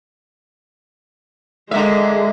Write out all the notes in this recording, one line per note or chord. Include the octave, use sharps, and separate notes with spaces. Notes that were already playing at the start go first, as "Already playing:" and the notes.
D3 G#3 A#3 E5